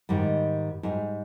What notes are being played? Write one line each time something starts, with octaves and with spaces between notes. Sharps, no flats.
G#2 D#3 G3
G#2 G3 G#4